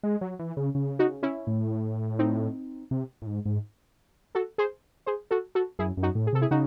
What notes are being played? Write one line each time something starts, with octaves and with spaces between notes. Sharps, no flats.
G#3
F#3
E3
C#3
C#3
D#4 F#4
C#4 E4
A2
C4 D#4
C3
A2
G#2
G#2
F#4 A4
G#4 C5
G#4 C5
F#4 A4
F#4 A4
F#2 E4 G#4
F#2
D#4 F#4
A2
G#4
C3 A4
E4 G#4
C#3 D#4 F#4